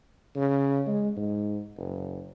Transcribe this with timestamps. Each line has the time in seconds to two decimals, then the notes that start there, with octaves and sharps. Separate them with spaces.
0.36 C#3
0.86 G#3
1.17 G#2
1.78 F#1